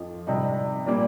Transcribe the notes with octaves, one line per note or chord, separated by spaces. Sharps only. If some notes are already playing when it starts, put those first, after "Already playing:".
Already playing: F2 F3 D#4
C3 G3 D#4
A#2 G3 A#3